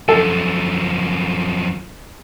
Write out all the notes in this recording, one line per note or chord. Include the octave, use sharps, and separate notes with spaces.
F#2 F3 A4